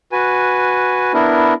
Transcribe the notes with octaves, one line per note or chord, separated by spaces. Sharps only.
F#4 B4 G#5
B3 D4 E4 A#4